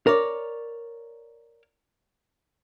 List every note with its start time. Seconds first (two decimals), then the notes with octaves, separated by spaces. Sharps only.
0.07 A#4 C#5 D5